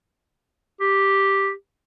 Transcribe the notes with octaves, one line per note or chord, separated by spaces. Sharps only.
G4